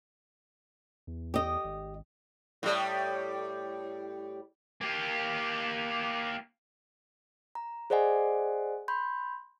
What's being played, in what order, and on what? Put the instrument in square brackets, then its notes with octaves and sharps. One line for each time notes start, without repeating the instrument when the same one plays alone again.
[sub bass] E2
[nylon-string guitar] G4 D#5
[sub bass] G#1
[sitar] A2 G3
[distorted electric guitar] A#3 G4
[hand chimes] A#5
G#4 C5 D5 D#5 F#5 G#5
B5 C6 G6